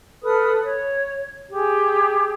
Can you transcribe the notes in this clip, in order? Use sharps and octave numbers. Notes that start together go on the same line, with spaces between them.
A4 B4 D#6 F6
C#5
G4 G#4